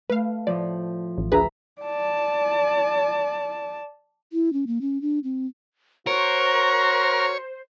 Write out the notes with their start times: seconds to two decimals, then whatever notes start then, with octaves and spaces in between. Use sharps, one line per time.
0.10 A3 B4 F5
0.47 A2 F3 D5
1.18 A1
1.32 D2 G#4 B4 E5 A#5 B5
1.81 D5 A5
4.33 E4
4.53 C#4
4.67 A#3
4.81 C#4
5.02 D4
5.24 C4
6.07 F#4 A#4 C5 C#5